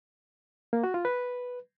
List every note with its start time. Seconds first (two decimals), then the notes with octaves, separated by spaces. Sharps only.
0.73 A#3
0.84 F#4
0.94 F4
1.05 B4